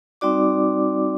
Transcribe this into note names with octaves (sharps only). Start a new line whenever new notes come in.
G3 C4 D#4 F#4 D5 D6